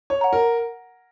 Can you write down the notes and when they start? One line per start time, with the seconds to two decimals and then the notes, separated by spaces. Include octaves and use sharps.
0.10 C#5
0.21 F#5 A#5
0.33 A#4